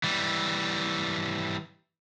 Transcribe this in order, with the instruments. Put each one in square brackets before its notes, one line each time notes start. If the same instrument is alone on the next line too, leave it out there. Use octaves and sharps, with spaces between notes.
[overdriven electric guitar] E3 G3